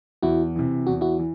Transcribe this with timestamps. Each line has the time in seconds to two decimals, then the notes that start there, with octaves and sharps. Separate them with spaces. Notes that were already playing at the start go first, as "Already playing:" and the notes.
0.23 E2 E4 F#4
0.55 C3 E3
0.87 E2 F#4
1.01 E4 F#4
1.19 E3